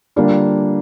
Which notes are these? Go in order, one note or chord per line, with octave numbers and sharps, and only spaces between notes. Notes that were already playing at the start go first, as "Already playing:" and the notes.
D3 G3 A#3 D4 F4